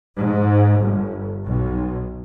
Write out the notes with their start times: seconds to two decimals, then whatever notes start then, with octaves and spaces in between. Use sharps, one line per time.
0.17 G#2
0.80 G1
1.45 B1